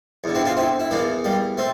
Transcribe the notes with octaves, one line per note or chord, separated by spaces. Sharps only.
E2 D3
C4 E4
D4 F4
C4 E4
E4
E2 E3 A#3 D4
G3 A#3
A3 C4